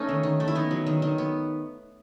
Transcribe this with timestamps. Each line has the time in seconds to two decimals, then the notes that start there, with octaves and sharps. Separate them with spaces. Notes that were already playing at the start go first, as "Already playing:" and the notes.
Already playing: A3 B3 C#4 D#4
0.09 D#3
0.23 D#3
0.40 A3
0.48 E4
0.55 B3 D#4
0.71 F#3
0.87 D#3
1.02 D#3
1.18 B3